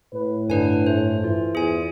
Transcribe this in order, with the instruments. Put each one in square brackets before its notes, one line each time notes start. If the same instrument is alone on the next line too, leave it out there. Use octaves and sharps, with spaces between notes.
[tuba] A2 [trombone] B4
[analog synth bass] G2 [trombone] D3 [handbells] D4 B4 G#5
[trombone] A3 [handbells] C5
[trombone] E3 [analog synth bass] F4
[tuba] E2 [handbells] G#4 G#5